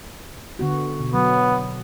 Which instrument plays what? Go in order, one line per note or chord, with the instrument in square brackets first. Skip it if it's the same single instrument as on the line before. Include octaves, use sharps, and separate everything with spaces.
[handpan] D3 B3 F#4
B2
[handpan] F#3 [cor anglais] B3